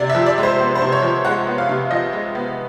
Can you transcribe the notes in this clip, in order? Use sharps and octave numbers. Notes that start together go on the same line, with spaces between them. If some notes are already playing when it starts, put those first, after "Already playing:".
Already playing: C3 D5
E5
F3
D5
G#3
C5
B3
C5
C3
C#5
F3
G#3 F#5
B3
F5
C3
F3 D#5
G#3
B3